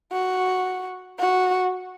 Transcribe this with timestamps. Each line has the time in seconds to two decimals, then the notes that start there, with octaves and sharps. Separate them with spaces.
0.12 F#4
1.19 F#4